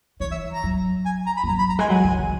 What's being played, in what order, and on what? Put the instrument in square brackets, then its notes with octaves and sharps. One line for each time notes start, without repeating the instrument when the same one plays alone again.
[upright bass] E3 [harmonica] C#5
[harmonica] E5
A#5
[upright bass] F#3
[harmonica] G#5
A#5
B5
[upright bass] G#3
[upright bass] F#3 [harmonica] A#5
[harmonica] B5
A#5
[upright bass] G#3 [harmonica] G#5
[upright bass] F#3 [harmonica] G#5
[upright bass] E3
D#3